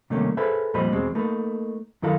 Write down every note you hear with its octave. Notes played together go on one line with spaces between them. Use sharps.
C3 D#3 G3 A3 A#3 C#4
G#4 A4 B4 C5 E5
F2 A#2 G3 C5 D#5 B5
E2 B2 G#3 C4
A3 A#3 D#4 B4
F#2 D#3 E4 A4 A#4 F5